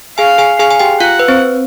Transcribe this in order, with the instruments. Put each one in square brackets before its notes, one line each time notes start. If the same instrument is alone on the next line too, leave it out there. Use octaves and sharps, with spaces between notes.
[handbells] G#4 G#5 [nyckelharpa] F5
[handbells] G#4 G#5
[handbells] G#4 G#5 [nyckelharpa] F5
[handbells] G#5
G4 G5
[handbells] F4 F5 [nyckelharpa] F#5
[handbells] B4
C4 C5